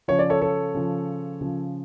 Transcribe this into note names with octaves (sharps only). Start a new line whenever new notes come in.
C#3 F3 C#5
D5
A4 C#5
A4 C#5
C#3 F3
C#3 F3